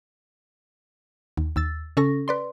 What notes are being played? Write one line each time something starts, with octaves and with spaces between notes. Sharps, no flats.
D#2
D#2 E6 A6
C#3 C#4 A4 C#6 A#6
B4 D5 C6